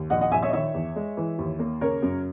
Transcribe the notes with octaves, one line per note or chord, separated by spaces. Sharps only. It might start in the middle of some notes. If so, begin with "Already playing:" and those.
Already playing: D#2
A#1 D#5 F#5
D#5 F#5
A#1 E5 G#5
C#5 E5
D#5
D#3 C#5 E5
E2
G#3
E3
D#2
A#3
C#3 A#4 C#5
F#2